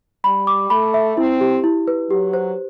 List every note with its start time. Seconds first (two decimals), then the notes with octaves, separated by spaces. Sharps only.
0.24 G3 B5
0.47 D6
0.70 A3 B5
0.94 E5
1.17 C4 E4
1.41 G4
1.64 E4
1.88 B4
2.10 F#3 G4
2.33 C5